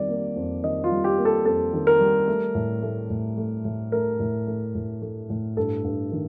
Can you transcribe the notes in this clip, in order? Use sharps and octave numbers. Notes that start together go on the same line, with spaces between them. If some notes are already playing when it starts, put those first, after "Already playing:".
Already playing: F2 D#3 G3 D5
A#3
F2
D#3 D#5
F4
G3
G4
A#3
A4
F2 A4
D#3
A#4
G3
A3
A2
A3
A2
A3
A2
A3 A#4
A2
A3
A2
A3
A2
G2 A4
G2
D#3